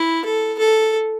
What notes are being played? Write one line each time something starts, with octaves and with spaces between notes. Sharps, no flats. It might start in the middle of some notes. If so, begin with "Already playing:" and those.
Already playing: E4
A4
A4